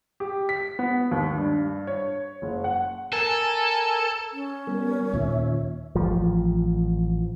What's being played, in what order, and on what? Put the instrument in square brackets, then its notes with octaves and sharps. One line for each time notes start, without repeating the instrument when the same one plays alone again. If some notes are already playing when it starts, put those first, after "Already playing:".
[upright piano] G4
B6
B3
D#2
G2
C#5
F#1
F#5
[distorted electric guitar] A4 [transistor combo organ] A#4 G#5 A5
[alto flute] C#4
[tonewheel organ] G3 B3 A#4
[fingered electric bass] D#2 A#2 [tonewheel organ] C#5 E5
[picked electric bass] A1 F3